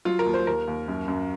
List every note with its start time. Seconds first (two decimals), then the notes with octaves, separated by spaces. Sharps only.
0.05 F#3 F4
0.19 A#4
0.26 D#2
0.34 C5
0.47 D#2 A#4
0.67 D#2
0.88 F#2
1.08 F#2